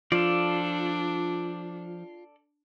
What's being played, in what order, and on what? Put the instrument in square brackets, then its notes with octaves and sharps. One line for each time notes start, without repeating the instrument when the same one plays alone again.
[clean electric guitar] F3 [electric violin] D4 [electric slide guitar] F4 [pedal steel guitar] A4 D5